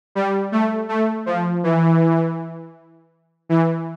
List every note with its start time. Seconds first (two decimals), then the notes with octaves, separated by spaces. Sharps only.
0.15 G3
0.52 A3
0.89 A3
1.26 F3
1.63 E3
3.49 E3